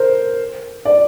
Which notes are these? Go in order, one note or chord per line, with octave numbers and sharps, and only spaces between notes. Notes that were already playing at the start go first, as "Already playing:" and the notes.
Already playing: A#4 C5
D5